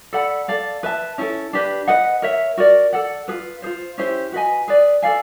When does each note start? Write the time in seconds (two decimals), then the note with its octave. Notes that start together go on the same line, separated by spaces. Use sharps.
0.13 A4 D5 F#5 B5
0.48 A4 D5 F5
0.83 B4 E5 A5
1.18 C#4 E4 A4
1.53 D4 G4 B4
1.88 B4 D#5 F#5
2.22 A#4 C#5 E5
2.57 F#4 A#4 D5
2.93 A4 D5 F#5
3.28 F4 G#4 B4
3.62 G#4 C5
3.66 F4
3.98 C#4 E4 G4 C5
4.32 F#4 B4 D#5 G#5
4.68 G#4 B4 D5
5.02 A4 D5 F5 G#5